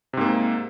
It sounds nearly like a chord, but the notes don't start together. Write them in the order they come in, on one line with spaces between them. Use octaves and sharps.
C3 G#2 A#3